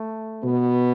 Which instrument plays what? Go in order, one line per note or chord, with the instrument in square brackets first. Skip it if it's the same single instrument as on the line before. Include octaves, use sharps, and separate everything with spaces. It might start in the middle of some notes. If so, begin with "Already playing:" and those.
Already playing: [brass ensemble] A3
B2 B3